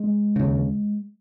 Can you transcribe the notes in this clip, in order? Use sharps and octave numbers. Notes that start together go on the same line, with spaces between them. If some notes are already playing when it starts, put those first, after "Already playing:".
Already playing: G#3
D#2 C#3